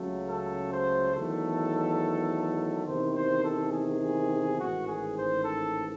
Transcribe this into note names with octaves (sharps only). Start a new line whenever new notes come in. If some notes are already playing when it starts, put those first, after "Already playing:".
Already playing: C#2 C#3 F#3 A3
A4
C5
E2 D#3 F#3 A3 A4
E2 C3 D#3 C5
C5
A4
G#4
A1 G#2 D#3 F#4
G#4
C5
A4